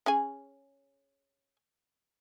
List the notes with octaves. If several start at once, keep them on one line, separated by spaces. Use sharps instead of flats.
C#4 G#4 G#5